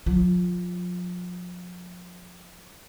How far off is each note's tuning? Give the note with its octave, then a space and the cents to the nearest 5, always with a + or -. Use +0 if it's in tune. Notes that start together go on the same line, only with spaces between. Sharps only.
F3 +40 F4 +0